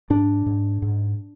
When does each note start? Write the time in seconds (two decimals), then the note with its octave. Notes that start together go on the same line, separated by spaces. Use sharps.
0.10 G#2 D4
0.46 G#2
0.82 G#2